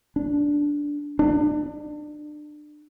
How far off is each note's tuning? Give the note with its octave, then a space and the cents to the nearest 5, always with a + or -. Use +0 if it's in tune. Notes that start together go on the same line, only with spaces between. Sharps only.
D4 -10
D4 +30